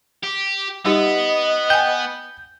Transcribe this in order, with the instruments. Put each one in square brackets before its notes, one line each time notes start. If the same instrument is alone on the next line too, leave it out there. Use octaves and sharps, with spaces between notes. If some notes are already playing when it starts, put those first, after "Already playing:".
[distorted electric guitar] G4
[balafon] G3 D#4 G4 [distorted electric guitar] B3 [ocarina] D#5
[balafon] G5 G#5 [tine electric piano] G6